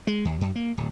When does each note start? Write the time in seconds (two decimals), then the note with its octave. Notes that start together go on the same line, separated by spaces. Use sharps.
0.07 G#3
0.25 D#2
0.41 F#2
0.55 A#3
0.77 D1